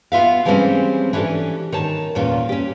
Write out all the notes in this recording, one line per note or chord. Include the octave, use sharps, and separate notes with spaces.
B3 F4 E5 F5
E3 F3 G3 G#3 C4 C#4
E3 C#4 D4 G4 A4
D#3 C#5 A5
E2 A#2 C#4 F4
C#4 G4